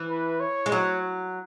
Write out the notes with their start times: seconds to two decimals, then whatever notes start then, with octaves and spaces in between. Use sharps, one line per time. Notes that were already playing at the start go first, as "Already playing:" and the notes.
Already playing: E3
0.09 B4
0.40 C#5
0.66 G#3
0.72 F#3 C#5